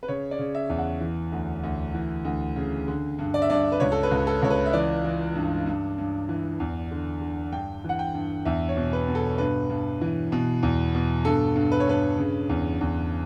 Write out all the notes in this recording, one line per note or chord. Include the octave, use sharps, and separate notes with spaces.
B4
C#3 C#5
D5
C#3
E5
E2
F#5
E3
D2
D2
E3
D2
C#3
D3
G2
D5
E5
G2 D5
B4
C#2 C#5
A4
B4
C#2
A4
C#2 C#5
B4
E5
E3 D5
E3
G2
G2
G2
E3
E2
D3
D3
G2 G5
E3 F#5
G5
G2
E2 E5
C#5
B2
B4
B2
A4
G2 B4
G2
E3
B2
E2
B2
G2 A4
G2
B4
C#5
G2 B4
C#3
E2
E2